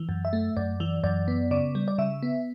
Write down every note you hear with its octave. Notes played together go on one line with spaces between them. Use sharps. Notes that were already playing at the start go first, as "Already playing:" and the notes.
Already playing: E3
F#2
E5
A3
F#2 D5
E3
F#2 D5
B3
C#3 D5
G3
D5
C#3 E5
B3